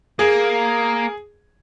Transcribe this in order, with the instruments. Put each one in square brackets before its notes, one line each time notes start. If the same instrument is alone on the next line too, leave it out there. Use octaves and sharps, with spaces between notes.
[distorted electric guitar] A#3 [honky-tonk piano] G#4